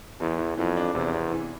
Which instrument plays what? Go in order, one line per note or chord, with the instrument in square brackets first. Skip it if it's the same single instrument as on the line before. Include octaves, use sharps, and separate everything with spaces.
[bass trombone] E2 [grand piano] E3
[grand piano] E3
[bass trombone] F2 [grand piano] E3
[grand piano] D4
[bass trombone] E2 [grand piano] C3
[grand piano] C3
E3